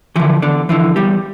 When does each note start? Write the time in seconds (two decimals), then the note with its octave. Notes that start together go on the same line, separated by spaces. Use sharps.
0.16 D3 E3 F3 E4
0.42 E2 D3 D4
0.69 D3 E3 F3 E4
0.96 E2 G3 G4